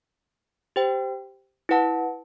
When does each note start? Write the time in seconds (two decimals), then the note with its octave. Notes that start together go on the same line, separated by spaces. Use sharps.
0.76 G4 C5 G5
1.69 E4 B4 F#5 A5